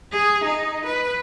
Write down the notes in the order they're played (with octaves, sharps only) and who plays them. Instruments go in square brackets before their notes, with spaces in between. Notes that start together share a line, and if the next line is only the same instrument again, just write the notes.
[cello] G#4
D#4
B4